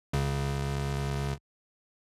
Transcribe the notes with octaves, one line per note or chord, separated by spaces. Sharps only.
C#2 C#3